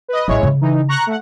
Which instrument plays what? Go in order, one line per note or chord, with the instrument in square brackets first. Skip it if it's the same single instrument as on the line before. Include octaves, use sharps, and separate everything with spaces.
[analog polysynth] B4 D#5
[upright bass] A1 C#4 [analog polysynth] G#3 E4 C#5
[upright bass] C#3
[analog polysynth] E3 D#4
A#5 C#6 F#6
A3 F#5